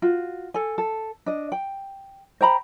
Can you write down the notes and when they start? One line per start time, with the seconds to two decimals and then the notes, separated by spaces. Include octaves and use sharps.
0.02 F4 F#4
0.54 A4 G#5
0.78 A4
1.26 D4 D#5
1.52 G5
2.41 C5 G5 A#5 B5